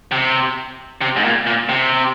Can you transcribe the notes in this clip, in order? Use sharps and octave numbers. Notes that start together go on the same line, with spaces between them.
C3
C3
G#2
A#2
A#2
C3